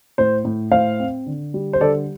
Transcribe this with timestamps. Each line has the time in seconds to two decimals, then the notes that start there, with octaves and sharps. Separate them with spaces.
0.18 A2 C5
0.45 A2
0.71 A2 C5 F5
1.00 C4
1.26 D3
1.54 G3
1.73 C5
1.80 D3 A4 D5